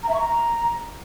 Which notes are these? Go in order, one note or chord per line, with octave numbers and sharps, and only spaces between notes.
A#5
E5
C#6
A#5